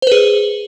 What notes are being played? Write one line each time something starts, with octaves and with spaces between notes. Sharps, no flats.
G#4 B4 C5